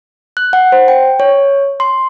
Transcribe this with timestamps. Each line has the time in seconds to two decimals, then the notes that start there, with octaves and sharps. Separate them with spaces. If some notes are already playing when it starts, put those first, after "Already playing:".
0.37 F#6
0.53 F#5
0.72 C5
0.88 G5
1.20 C#5
1.80 C6